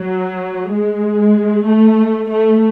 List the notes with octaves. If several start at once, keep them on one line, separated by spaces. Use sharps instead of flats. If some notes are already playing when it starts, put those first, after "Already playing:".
Already playing: F#3
G#3
A3
A3